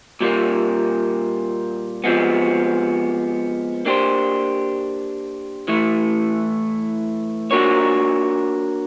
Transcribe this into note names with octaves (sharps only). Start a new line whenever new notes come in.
A#2 G3 A#3
C3 F3 G#3 B3
A#3 D4 G4 C5
A2 E3 A3
A#3 D4 F#4 A#4 C#5